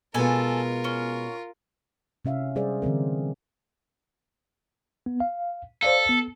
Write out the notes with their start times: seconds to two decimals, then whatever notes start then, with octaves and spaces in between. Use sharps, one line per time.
0.14 B2 G#3 B3 F4 A4 A#4 G#5
0.84 C#4
2.25 C3 C#4 E5 F5
2.56 G3 G#4 C5 D5
2.82 D3 E3 C4 A#4
5.06 B3
5.20 F5
5.83 A4 C5 D5 F5
6.09 B3